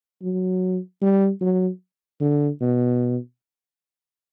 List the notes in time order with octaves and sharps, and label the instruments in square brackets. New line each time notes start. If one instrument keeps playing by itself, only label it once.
[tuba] F#3
G3
F#3
D3
B2